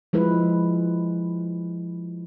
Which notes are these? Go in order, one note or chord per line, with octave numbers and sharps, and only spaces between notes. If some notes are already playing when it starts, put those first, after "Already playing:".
F3 G#3 E4 B4